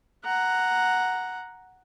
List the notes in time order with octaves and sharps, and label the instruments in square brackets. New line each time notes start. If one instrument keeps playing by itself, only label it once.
[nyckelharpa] F#5 A#5